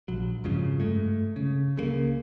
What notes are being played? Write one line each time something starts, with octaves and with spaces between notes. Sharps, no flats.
A#1 F#3
F2 G#2 C#3 F3
G2 G#3 A3
C#3
C#2 C#3 G3 A#3